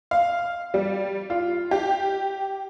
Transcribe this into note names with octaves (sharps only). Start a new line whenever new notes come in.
F5
G3
F4
G4